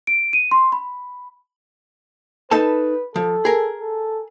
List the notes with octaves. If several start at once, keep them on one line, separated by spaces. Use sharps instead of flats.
D7
D#7
C6
B5
D#4 A4 B4 A5
F3 A4
G#4 A#4
A4